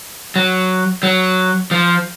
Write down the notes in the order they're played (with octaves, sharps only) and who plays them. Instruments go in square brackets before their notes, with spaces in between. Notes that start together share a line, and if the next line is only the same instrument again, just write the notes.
[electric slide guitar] F#3
F#3
F3